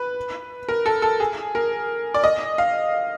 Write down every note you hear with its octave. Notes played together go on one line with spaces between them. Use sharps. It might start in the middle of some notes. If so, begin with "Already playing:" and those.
Already playing: B4
A#4
A4
A4
G#4
A#4
D5
D#5
F5